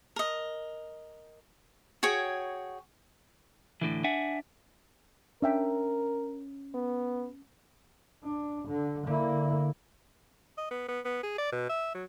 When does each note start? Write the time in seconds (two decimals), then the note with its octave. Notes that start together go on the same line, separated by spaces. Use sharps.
0.16 A#4 D#5
2.03 F#4 G#4 C#5 G5
3.81 A2 D3 E3
4.04 D4 E5 F#5 G#5
5.42 C#4 D4 A#4 E5 G5
6.74 B3
8.23 D4
8.68 D3
9.07 D3 A#3 E4
10.58 D#5
10.71 B3
10.88 B3
11.05 B3
11.24 G#4
11.38 D5
11.52 B2
11.69 E5
11.94 F#3